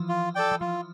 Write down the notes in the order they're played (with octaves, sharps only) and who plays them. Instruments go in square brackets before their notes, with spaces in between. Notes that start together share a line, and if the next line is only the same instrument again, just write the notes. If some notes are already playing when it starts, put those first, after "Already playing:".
Already playing: [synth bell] E3 F3
[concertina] F4
A4 D5 G5
[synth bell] E3
[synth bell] F3 [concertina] F4